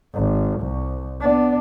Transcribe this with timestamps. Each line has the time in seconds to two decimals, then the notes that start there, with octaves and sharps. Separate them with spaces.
0.14 G#1
0.60 C2
1.21 B3 D4